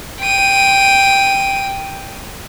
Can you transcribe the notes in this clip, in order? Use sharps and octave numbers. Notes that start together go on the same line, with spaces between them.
G5 D#7